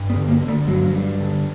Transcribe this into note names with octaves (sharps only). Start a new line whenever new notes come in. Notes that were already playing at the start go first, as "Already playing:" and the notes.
Already playing: G2
B3
D3
A#3
D3
A3
G2 F#3
G2
D3